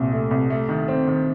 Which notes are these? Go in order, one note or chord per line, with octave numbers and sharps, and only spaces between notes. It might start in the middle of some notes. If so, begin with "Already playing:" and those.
Already playing: C2 A#2
A3
C2
A3
D#3
C4
D#3